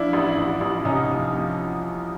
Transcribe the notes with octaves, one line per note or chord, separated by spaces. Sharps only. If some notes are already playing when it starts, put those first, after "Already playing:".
Already playing: F3 D4 E4
A1
A1
A1
C2 C#4 D#4
F3
F3